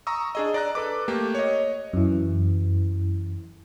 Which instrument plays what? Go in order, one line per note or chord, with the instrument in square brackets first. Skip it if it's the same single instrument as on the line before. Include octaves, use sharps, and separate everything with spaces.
[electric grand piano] A#5 C#6 D#6 E6
D4 G#4 D#5
D5 A#5 F#6
A4 B4 D6
A3 A#3 G4
C#5 D#5
[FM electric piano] F#2 E3